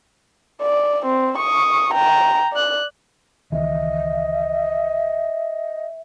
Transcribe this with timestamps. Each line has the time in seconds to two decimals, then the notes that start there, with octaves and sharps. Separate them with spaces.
0.62 D5
1.06 C4
1.38 C#6 D#6
1.94 G5 A#5
2.52 D5 F#6
3.52 C#2 D#3 E3 D#5 E5